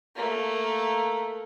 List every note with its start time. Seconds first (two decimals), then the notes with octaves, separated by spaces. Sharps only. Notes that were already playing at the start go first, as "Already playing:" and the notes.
0.16 A3 A#3